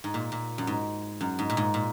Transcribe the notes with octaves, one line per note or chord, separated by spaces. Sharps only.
G#2
A#2
A#2
F#2
G#2
F#2
G#2
A#2
G#2
A#2